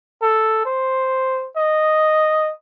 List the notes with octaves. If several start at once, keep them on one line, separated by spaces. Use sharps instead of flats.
A4
C5
D#5